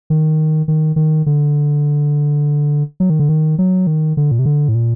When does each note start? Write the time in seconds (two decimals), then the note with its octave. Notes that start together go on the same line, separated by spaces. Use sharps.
0.10 D#3
0.68 D#3
0.96 D#3
1.26 D3
3.00 F#3
3.10 D#3
3.19 D3
3.29 D#3
3.58 F#3
3.87 D#3
4.17 D3
4.31 A#2
4.39 C3
4.46 D3
4.69 A2
4.75 A#2